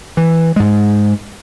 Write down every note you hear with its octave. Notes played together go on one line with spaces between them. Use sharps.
E3
G#2 G#3